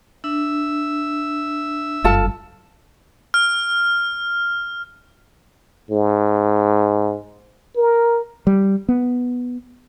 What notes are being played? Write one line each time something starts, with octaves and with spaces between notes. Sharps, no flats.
D4 E5 E6
F#1 G2 F4 A4 A5
F6
G#2
A#4
G3
B3